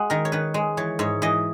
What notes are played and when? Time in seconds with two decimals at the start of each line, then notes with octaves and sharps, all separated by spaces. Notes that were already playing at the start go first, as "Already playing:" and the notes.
Already playing: G#3 F#5
0.10 D#3 A#4
0.25 C#5
0.32 D#3 B4
0.54 G#3
0.77 E3 C#5
0.99 G#2 C#5
1.22 E3 D#5